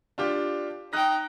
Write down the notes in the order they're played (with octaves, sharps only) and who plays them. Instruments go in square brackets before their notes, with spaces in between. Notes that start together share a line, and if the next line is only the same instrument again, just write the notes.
[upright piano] D4 F4 G4
[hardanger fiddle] D#4 G5 [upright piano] D#6 F#6 A#6